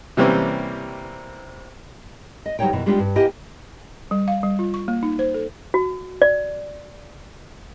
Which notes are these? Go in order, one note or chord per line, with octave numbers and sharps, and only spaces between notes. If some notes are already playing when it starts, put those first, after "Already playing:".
C3 E3 G3 A#3 C4 C#4
D#5
D2 F#3 G3 D#4 C#5 G5
F#2 B2 E3
G3 G#3 B3 D4 F4 G4
G2
A#3 B3 E4 G4 D#5 G#5
G3
F5
G3
F4
C#6
A#3
D#4
C5
A4
F#4
D5